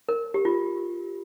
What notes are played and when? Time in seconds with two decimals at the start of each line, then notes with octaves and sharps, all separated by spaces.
0.09 A#4
0.34 G4
0.45 F4